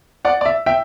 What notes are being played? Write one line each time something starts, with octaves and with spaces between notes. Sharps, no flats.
D5 F#5
D5
E5
E5 G5